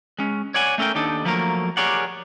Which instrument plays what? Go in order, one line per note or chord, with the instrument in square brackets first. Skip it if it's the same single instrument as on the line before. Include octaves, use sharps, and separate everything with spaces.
[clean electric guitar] G#3 C#4
C#5 D5 F#5 G#5
A3 C#4 A4 A#4 G5
D#2 D4 D#4 A4
F3 F#3 A3 A#3 A#4
G4 G#4 A#4 C#5 D5 F#5